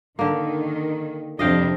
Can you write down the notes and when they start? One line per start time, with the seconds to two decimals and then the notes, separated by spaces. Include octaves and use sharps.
0.19 D3 D#3 A#3
1.39 F2 C3 D4 D#5 F5 G5